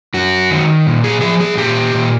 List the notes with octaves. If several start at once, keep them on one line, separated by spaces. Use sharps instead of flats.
F#2 F#4
D#3
A#2
G#4
F3 G#4
G#4
A#2 G4
A#2